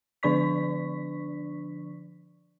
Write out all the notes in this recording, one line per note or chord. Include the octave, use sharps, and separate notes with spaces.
D3 F3 D4 D5 C#6 B6